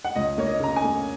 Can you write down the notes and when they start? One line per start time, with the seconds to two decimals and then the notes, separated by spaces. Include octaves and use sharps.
0.04 F#5
0.16 C#2 D#5
0.38 A#3 C#5
0.46 D#5
0.60 C#3 A#5
0.76 G#5
0.84 A#3